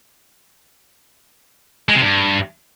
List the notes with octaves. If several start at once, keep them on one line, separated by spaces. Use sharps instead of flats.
G#3
C3
G2